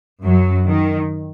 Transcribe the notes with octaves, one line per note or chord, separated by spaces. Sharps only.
F#2 F#3
D#3